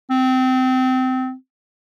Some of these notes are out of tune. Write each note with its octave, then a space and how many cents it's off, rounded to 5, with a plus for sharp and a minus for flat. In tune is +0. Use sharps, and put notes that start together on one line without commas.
C4 -25